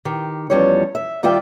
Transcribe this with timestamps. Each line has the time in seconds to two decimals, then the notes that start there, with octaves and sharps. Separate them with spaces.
0.05 D#3 G4
0.50 E2 F3 G3 C#4 C#5
0.95 E5
1.23 D#3 G3 F4 D5 E5 G5